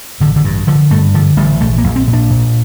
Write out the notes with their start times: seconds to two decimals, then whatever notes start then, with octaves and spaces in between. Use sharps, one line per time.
0.20 A1 D3
0.36 D3
0.45 G2
0.67 D3 F3
0.91 G2 A3
1.14 D3 F3
1.37 A1 G3
1.61 A#1 A3
1.78 A#3
1.84 A#1
1.96 C4
2.08 A#2
2.13 D4
2.30 A#2